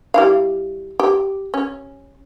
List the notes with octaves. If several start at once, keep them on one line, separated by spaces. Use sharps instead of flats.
G3 E4 F5
G4
C#4